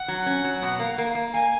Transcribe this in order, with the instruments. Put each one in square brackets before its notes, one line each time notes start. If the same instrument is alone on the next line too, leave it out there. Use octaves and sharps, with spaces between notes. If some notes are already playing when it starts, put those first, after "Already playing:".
Already playing: [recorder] F#5
[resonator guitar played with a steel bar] F#3
C#4
F#3
B2
A#3
A#3
A#3
[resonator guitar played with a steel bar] A#3 [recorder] G#5